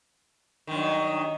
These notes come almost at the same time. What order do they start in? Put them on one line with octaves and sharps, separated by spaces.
D#3 G2 F#3